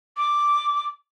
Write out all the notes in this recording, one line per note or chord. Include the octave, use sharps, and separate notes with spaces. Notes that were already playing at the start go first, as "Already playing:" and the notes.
D6